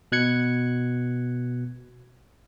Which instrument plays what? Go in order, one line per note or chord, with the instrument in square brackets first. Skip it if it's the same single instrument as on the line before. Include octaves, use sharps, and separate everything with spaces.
[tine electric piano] B2 F#6 G#6 C#7